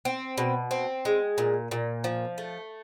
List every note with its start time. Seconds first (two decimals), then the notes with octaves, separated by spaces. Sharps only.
0.05 C4
0.38 B2
0.71 C4
1.05 G#3
1.38 A#2
1.71 A#2
2.04 F3
2.38 A3